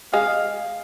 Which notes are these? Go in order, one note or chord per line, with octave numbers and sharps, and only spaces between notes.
G#3 G#4 F5